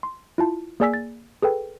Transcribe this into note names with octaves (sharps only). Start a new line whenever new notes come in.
C6
E4 F4 A5
A#3 G#4 D5 G#5 E6 B6
A6
G#4 A4 B4 G5